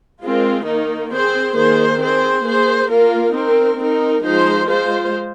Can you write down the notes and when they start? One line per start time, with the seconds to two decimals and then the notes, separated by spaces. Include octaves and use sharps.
0.23 G#3 C4 F4 A#4
0.67 D#3 A#3 D#4
1.12 C4 G#4 C5
1.56 D#3 A#3 G#4 C5
2.01 C4 G#4 C5
2.46 A#3 G#4 C5
2.90 A#3 F4 A#4
3.34 C4 D#4 A#4
3.79 C4 D#4 A#4
4.23 F3 G#3 D#4 C5
4.68 G#3 F4 C5